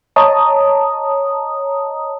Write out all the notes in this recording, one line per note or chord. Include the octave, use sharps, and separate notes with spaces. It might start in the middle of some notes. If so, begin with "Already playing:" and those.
C#5 D#5 A5 A#5 D#6